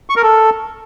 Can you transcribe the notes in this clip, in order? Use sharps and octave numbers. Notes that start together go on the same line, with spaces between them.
C#6
A#4
A4